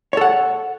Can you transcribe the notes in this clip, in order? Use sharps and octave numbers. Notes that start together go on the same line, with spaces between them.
A4 C#5 F#5